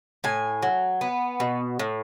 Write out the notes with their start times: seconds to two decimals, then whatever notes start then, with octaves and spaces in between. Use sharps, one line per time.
0.24 A2 G#5
0.62 F#3
1.01 B3
1.40 B2
1.79 A2